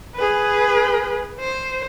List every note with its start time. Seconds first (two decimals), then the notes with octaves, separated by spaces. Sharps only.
0.15 G#4 B4
1.40 C5